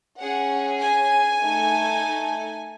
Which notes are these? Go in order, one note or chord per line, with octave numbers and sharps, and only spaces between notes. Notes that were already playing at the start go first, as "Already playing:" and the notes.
C#4 G#4 F#5
G#5
A3 D#4 A4